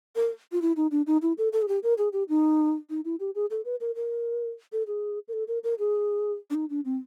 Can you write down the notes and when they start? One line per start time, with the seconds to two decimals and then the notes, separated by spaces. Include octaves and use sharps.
0.16 A#4
0.52 F4
0.62 E4
0.76 D#4
0.91 D4
1.07 D#4
1.22 E4
1.38 A4
1.53 A4
1.62 G#4
1.68 G4
1.83 A#4
1.98 G#4
2.13 G4
2.29 D#4
2.90 D#4
3.05 E4
3.20 G4
3.35 G#4
3.51 A4
3.65 B4
3.81 A#4
3.95 A#4
4.72 A4
4.87 G#4
5.28 A#4
5.33 A4
5.48 A#4
5.64 A#4
5.79 G#4
6.50 D4
6.55 D#4
6.70 D4
6.85 C4